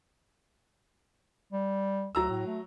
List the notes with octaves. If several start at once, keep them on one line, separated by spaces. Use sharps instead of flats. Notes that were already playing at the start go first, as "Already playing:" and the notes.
G3
D2 F#3 A#5 E6
A2
A3